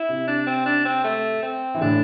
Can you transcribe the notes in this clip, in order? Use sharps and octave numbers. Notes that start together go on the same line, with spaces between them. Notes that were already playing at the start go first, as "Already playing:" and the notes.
Already playing: E4
C3
D4
C4
D4
C4
A3
C4
E3
A2 D3 D4